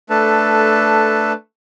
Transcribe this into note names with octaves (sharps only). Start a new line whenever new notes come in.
A3 D4 A4 B4 A5